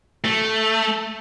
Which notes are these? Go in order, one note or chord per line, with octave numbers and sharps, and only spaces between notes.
A3